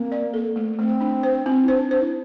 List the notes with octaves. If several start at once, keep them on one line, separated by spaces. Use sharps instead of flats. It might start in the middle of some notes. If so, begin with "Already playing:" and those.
Already playing: A#3 C4
D5
A4
A3
A3 C4
D4
C5
C4
E4
D4 C5
D4 C5
E4